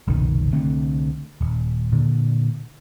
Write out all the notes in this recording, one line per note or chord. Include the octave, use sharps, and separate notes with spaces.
F#1 C2 B2 D#3
C2 D3 A3 C4
D#1
A#2 D3